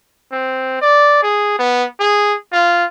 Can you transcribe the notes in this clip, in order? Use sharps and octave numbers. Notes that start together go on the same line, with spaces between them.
C4
D5
G#4
B3
G#4
F4